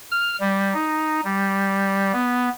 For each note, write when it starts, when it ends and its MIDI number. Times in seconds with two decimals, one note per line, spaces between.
0.11 0.36 89
0.40 0.73 55
0.74 1.21 63
1.25 2.12 55
2.13 2.49 59